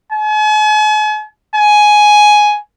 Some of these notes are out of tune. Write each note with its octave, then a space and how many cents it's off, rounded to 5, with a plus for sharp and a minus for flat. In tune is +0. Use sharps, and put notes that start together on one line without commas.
G#5 +45
G#5 +10